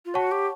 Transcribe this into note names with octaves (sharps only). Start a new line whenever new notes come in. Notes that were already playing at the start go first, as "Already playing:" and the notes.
F4
F#4 C#5 F#5 A5 C#6
G4